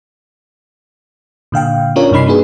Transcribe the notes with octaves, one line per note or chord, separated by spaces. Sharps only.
A#2 D3 F5 G5
C#4 D4 F4 A#4 C#5
G2 C3 D#4 B5 C7
A#3 D4 F#4 G#4 B4